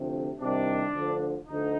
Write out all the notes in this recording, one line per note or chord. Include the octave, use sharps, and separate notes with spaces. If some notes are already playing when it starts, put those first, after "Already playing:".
Already playing: D2 C3 F3
C2 C3 D#3 D4
D2 D3 F3
D2 D3 F3 D#4